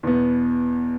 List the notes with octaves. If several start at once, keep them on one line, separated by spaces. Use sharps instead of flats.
E2 B2 B3